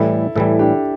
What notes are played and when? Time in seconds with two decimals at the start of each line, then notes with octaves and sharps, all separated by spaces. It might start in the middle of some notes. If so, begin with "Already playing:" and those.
Already playing: A2 E3 G3 E4 A4
0.36 A2 E3 G3 E4 A4
0.59 D4 G4